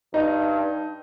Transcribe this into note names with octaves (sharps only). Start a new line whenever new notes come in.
G2 D#4